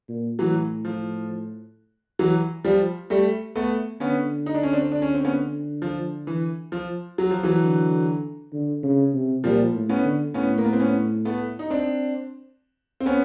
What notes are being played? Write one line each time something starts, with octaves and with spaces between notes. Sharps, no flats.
A#2
A2 E3 F#3
F3
E3 F#3
F3 G3
G3 A3
A3 B3
D3 B3 C#4
D#4
D4
C#4
C4 D4
D4
C#4
C4
B3 C#4
F3
E3
F3
F#3
F3
E3 F#3
D3
D3
C#3
C3
A#2 F3 G3
A2
B3 C#4
D3
A2 B3 C#4
A#3
B3
C4
B3 C#4
A3 B3
D#4
C4 D4
C4
B3 C#4